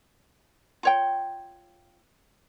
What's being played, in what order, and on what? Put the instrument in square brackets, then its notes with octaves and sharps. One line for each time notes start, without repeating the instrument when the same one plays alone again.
[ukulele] F4 C#5 G5